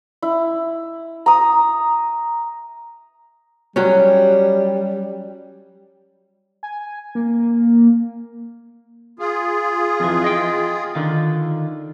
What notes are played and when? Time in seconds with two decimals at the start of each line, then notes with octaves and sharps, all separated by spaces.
0.22 E4
1.26 A#5 D#6
3.76 F#3 G3 C#4
6.63 G#5
7.15 A#3
9.19 F4 G#4
10.00 F2 E3
10.24 D#5 G5
10.95 D3 D#3 F4